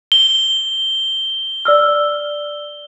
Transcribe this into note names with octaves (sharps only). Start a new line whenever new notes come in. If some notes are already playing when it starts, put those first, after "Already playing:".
G7
D5 E6 F6